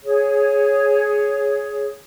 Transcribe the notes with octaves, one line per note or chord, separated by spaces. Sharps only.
G#4 C#5